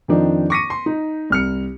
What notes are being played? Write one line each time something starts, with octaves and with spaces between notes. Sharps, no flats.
F2 D#3 F3 D4 D#4
C#6 D6 A#6 B6 C#7 D#7
C6
D#4
C2 F6 C#7